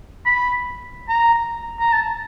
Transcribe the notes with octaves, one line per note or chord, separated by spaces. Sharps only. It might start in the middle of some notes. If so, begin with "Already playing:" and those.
B5
A#5
A#5
A5